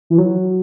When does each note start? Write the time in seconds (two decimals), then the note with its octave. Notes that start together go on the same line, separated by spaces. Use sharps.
0.10 E3
0.18 F#3